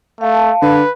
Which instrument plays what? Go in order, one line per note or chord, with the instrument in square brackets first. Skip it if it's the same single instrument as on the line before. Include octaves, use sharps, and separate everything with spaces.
[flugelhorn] A3 [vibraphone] F5 A5
[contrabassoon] D3 [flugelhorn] B4